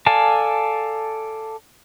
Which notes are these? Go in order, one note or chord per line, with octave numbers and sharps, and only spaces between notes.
A4 D5 F5 G#5 A5